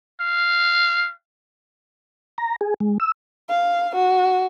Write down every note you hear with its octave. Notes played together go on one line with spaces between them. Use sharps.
F5
A#5
G#4
G#3
E6
F5
F#4